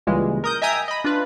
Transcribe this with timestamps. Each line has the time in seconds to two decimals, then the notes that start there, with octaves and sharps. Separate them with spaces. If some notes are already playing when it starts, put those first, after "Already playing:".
0.07 C#2 A#2 C#3 E3 G3 G#3
0.44 A#4 D#6 G6
0.62 D#5 E5 G5 G#5 A#5 D#6
0.88 D#5 B5
1.04 D4 F4 B4